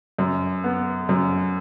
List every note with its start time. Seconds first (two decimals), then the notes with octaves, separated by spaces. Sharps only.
0.18 F#2
0.64 B3
1.09 F#2